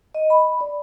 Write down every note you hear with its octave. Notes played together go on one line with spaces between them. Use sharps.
D#5
B5
D5